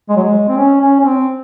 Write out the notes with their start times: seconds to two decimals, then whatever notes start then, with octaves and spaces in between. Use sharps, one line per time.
0.09 G#3
0.16 F#3
0.24 G#3
0.48 C4
0.57 C#4
0.81 C#4
0.99 C#4
1.05 C4